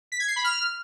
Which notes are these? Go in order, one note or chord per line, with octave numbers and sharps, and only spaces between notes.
B6
G#6
C7
B5
F6